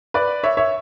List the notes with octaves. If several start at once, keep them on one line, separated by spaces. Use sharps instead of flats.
B4 D5
C#5 E5
C#5 E5